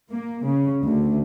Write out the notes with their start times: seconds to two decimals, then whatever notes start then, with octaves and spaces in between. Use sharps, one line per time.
0.12 A#3
0.46 C#3
0.85 D2